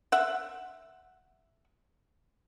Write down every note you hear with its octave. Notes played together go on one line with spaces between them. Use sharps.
E5 F#5